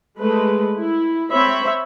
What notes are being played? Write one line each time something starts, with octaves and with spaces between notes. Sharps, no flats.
G#3 A3 B4
E4
C4 C#5 E5 B5